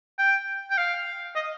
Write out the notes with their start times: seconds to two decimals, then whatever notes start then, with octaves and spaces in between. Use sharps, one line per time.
0.18 G5
0.71 G5
0.78 F5
1.35 D#5